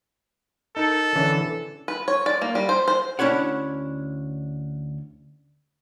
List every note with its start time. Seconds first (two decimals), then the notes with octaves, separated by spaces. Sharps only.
0.77 D#4 A4 A#4
1.15 D3 E3 C#4
1.88 B4
2.08 C#5
2.26 D5
2.42 A#3
2.55 G3
2.69 C5
2.88 C5
3.19 D2 C#4 D4 E4 C#5 F#5